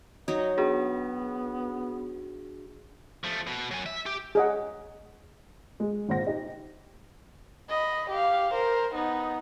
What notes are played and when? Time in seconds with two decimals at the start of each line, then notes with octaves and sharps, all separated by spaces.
0.28 F#3 D#4 C#5 D#5
0.58 B3 D4 F#4 G#4
3.24 F3 A3
3.47 B2
3.71 F#3 G#5
3.86 E5
4.06 G4
4.35 G#4 D#5 F#5
5.80 G#3
6.09 G#1 A#2 C5 F#5 A#6
6.27 D#4 G4
7.69 D#5 B5
8.10 G4 F5
8.54 A#4 C5
8.95 B3 D#4